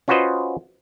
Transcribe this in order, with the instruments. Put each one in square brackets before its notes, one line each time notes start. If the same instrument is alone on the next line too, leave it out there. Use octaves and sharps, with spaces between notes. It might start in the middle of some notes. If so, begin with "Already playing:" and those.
[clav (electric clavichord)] C#4 F4 F#4 B4 C5 D#5